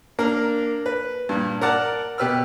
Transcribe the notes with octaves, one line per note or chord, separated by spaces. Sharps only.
A#3 D4 A#4
B4
G2 A#2
A#4 D5 F#5 A5
B2 G4 B4 E6 F6